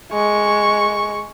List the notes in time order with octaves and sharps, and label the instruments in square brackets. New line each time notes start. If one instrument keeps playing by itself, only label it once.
[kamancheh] G#3 C#6